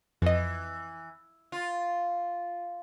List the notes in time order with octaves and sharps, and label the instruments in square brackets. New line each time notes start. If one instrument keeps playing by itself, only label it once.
[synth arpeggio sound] F2 D#5 [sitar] E3
[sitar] F4